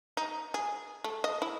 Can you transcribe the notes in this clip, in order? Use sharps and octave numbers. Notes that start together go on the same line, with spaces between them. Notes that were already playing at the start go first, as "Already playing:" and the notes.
D#4
G#4
A3
D#5
E4